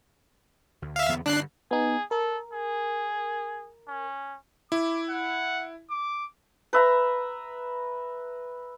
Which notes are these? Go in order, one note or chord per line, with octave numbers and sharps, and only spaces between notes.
D2
E5 F5
E2 D3 B3
G2 D3 D4 F#6 C7
B3 D#4 G#4
A4 A#4
G#4
C#4
E4 D6
F#5
D6
B4 E5 A#5